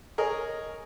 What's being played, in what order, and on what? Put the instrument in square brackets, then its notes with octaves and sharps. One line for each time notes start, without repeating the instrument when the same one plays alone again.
[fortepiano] G#4 A#4 C#5 D#5